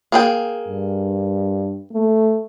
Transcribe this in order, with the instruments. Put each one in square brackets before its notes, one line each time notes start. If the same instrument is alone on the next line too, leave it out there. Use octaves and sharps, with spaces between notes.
[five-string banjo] A#3 G#4 G5
[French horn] G2
A3